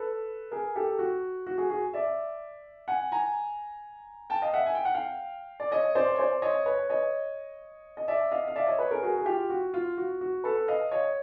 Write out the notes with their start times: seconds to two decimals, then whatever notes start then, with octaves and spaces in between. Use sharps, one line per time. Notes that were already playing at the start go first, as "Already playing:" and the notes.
Already playing: A4 B4
0.51 G#4 A#4
0.76 G4 A4
0.99 F#4
1.47 F#4
1.58 F#4 G#4
1.69 F#4 G#4
1.93 D5 E5
2.88 F#5 G#5
3.12 G#5 A#5
4.30 G5 A5
4.42 D#5 F5
4.53 E5 F#5
4.66 G#5
4.75 G5
4.85 F#5
4.94 F5 G5
5.60 D5
5.71 C#5 D#5
5.95 C5 D5
6.15 C#5
6.18 C5 D5
6.42 C#5 D#5
6.66 B4 C#5
6.89 C#5 D#5
7.97 D#5
8.08 D5 E5
8.31 D#5 F5
8.48 F5
8.56 D5 E5
8.67 C#5 D#5
8.79 B4 C#5
8.91 G#4 A#4
9.02 F#4 G#4
9.18 G#4
9.26 F4 G4
9.50 F#4
9.74 F4
9.98 F#4
10.21 F#4
10.44 A4 B4
10.68 D#5 F5
10.91 C#5 D#5